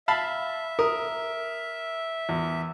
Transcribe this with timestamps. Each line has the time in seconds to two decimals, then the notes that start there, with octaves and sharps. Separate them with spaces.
0.08 E5 F5 A5 B5
0.79 A#4 D#6
2.29 E2